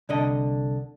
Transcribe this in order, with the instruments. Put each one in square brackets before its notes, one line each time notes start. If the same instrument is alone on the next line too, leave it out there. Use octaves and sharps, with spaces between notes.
[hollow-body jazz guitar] C2 D3 D#5 [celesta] D5 A5